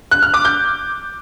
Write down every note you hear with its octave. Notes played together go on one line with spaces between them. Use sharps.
F#6
F6
D6
G6